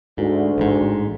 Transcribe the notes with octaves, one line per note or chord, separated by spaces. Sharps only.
D2 G#2
A1 G#2